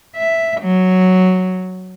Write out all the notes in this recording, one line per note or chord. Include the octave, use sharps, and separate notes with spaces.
E5
F#3